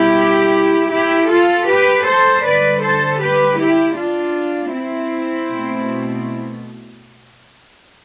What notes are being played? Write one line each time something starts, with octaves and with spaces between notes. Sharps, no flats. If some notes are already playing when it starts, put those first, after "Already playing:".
Already playing: B2 G3 E4 G4
E4 G4
F4 A4
G4 B4
A4 C5
D3 G3 B4 D5
A4 C5
G4 B4
E4 G4
D4 F4
C4 E4
B2 A3